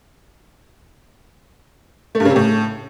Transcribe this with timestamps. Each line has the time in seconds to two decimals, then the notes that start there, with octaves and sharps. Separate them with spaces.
2.15 A3
2.20 G2
2.25 C#3
2.30 C3
2.36 A2